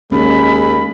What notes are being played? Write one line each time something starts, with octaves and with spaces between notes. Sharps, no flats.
D#2 G#3 C#4 B5